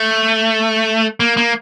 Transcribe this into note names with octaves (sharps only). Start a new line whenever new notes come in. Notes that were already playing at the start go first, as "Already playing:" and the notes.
Already playing: A3
A#3
A#3